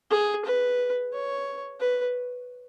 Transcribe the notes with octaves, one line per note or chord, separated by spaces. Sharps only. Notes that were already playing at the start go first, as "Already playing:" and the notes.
G#4
B4
C#5
B4